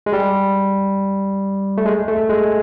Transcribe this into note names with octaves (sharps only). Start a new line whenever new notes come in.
G#3
G3
A3
G#3
A3
G#3